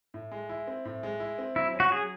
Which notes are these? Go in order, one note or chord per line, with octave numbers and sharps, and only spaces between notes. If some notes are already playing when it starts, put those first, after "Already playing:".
A2
G#3
E4
C4
A2
G#3
E4
C4
F#3 E4
C#4
F#4
F#3 G#4